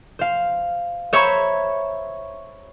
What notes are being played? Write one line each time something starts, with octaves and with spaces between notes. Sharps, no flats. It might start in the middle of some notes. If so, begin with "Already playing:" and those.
C5 F5
C5 C#5 E5 A#5 B5 C#6